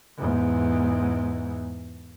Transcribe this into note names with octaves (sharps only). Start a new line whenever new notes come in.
E2 G#2